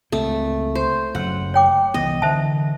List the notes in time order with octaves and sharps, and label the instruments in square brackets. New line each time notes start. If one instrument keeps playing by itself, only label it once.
[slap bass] C#2 A#3 C4 [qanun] A3
[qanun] C5
[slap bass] F#1 F#3 [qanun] F#5
[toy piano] C#5 G5 D6
[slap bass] C2 E3 B3 [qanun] D#5
[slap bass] D3 E3 [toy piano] C5 E5 A5